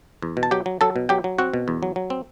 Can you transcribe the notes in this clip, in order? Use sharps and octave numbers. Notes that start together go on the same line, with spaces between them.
E2
B2
A5
F#3 G4 G5
F#3
F#3 A4 A5
B2
F#3 G4 G5
F#3
C4 F#4 F#5
B2
E2
F#3
F#3
C4